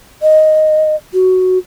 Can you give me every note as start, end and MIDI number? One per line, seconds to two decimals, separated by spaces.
0.22 0.96 75
1.14 1.58 66